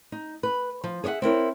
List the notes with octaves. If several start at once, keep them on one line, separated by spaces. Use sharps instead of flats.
D#4
B4
F3
G#4 C#5 D#5 E5 F#5
C4 E4 A#4 C#5